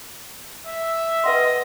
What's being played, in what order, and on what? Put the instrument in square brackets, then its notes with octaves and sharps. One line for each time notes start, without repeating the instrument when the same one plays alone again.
[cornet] E5
[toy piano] B4 F#5 C6 [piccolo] D#5